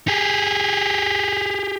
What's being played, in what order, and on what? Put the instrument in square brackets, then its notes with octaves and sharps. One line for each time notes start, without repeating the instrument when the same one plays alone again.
[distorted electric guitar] G4 G#4